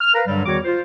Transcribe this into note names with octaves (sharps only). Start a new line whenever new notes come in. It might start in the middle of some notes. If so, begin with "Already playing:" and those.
F6
A#4 B4 F5 A#5
G2 D3 F#3 G3
E2 D#3 G3 F#4 C#5 D6
F4 C5